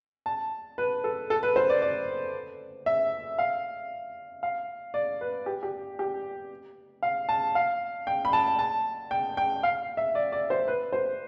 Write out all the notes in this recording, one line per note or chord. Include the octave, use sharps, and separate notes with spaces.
A5
B4
A4
A4
B4
C5
D5
D5
E5
F5
F5
D5
B4
G4
G4
G4
F5
A5
F5
G5
B5
A5
A5
G5
G5
F5
E5
D5
D5
C5
B4
C5